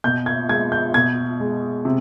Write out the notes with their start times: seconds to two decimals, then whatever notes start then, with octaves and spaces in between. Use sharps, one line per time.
0.04 B2 G6
0.26 G#6
0.49 G#3 G#6
0.72 G6
0.94 B2 G#6
1.40 G#3
1.85 C3